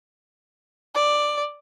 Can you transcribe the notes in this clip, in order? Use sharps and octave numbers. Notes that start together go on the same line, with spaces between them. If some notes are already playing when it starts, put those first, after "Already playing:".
D5